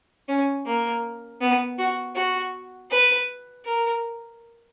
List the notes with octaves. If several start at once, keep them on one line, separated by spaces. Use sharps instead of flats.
C#4
A#3
B3
F#4
F#4
B4
A#4